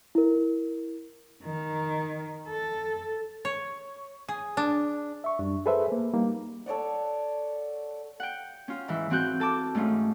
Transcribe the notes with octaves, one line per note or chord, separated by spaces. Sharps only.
E4 A#4
D#3
A4
C#5
G#4
D4
E5 C#6
F#2 G3 D4
G#4 A4 B4 C5 E5
A#3
G3 A#3 D#4
A4 C#5 D5 F#5
F#5 G5
C#4 F4
G#2 E3 E5
E3 C4 F#4 F#6 G6
A4 A5 D6
G#2 A3 C#4 F4